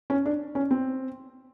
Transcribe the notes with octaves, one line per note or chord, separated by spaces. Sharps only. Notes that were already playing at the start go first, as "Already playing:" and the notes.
C#4
D4
C#4
C4